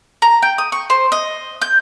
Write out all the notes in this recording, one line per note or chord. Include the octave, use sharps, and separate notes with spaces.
A#5
G5
D#6
C#6
C5
D#5
G6